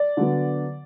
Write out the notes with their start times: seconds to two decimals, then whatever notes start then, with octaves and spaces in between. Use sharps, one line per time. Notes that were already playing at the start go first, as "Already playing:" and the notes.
Already playing: D5
0.17 D3 F#3 B3